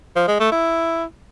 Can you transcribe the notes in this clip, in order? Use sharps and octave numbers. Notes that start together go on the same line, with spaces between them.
F3
G#3
A3
E4